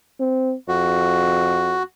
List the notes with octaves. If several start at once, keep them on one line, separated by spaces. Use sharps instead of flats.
C4
F2 F#4